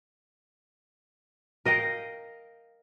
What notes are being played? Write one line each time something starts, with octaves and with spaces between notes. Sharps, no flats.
A#4 D#5 F5 G5